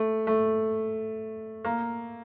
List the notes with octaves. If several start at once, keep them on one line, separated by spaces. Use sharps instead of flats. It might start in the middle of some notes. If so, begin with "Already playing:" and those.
Already playing: A3
A3
A#3